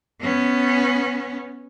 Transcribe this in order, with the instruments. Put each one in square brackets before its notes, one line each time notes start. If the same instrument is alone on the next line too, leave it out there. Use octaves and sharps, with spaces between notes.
[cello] B3 C#4